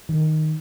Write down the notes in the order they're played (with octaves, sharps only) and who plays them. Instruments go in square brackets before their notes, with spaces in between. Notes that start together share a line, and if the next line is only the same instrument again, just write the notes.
[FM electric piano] D#3